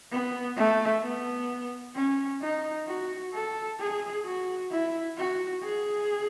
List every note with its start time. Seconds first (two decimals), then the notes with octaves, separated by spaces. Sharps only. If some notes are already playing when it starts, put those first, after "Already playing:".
0.11 B3
0.57 A3
1.03 B3
1.95 C#4
2.41 D#4
2.87 F#4
3.33 A4
3.79 G#4
4.25 F#4
4.71 E4
5.17 F#4
5.63 G#4